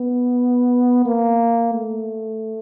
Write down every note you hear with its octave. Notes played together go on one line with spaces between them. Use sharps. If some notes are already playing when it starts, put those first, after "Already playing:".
Already playing: B3
A#3
A3